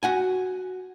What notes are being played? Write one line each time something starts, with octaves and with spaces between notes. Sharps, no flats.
F#4 F#5 G#5